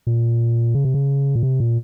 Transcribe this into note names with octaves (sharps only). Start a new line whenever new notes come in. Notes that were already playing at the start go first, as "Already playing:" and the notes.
A#2
C#3
C3
C#3
A#2
C3
A#2